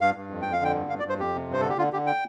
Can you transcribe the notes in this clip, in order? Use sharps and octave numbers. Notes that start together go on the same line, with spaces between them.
G2 F5
G2
F2
F2 G5
F5
D3 G5
G2
G2 F5
D5
G2
C5
F2 G4
C3
G2 C5
D3 A4
G4
D3 F4
D3 G4
G5